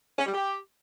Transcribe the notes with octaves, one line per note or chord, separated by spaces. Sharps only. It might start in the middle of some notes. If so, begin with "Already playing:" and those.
C#4
G3
G4